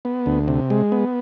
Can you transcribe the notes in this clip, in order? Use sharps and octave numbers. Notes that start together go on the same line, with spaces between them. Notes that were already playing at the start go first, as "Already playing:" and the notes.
B3
D2
C3
G#3
B3